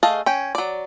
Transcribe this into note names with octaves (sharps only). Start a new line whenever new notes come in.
A3 G#4 D#5 F5 A5
C#4 G5
F#3 D5